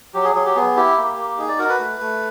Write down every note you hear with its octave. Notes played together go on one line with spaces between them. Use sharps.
F#3 G4
G#4
F#3 G#4
G4
B3 G#4
E4 G4
A#3
A#3
D#4 G#4
D5
F#4 A#4
B4
A3
A3